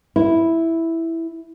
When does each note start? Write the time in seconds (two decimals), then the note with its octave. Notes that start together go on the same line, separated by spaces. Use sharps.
0.16 E4